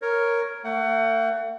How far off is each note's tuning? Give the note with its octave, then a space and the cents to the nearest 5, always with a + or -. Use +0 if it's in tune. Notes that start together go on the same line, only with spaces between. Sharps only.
A#4 +0 C#5 +0
A3 +45 F#5 +20